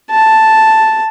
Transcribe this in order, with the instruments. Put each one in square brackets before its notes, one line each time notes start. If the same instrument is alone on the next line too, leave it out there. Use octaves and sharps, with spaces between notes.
[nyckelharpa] A5